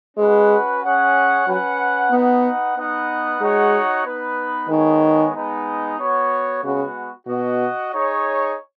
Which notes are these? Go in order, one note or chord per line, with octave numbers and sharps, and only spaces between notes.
G#3 C#4 F#4 B4 F#5
C#4 G#4 C#5 F#5
F#3 C#4 B4 F#5
B3 D#4 B4 F#5
B3 D#4 B4 D#5 F#5
G#3 D#4 F#4 C#5 F#5
B3 D#4 B4
D#3 G#3 B3 G#4 C#5
G#3 B3 D#4
B3 F#4 C#5
C#3 G#3 B3 F#4
B2 F#4 D#5 F#5
D#4 G#4 C#5